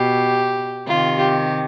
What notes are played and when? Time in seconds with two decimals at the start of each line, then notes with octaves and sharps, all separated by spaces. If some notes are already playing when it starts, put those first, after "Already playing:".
Already playing: B2 G4
0.87 C3 D#3 F4
1.18 G4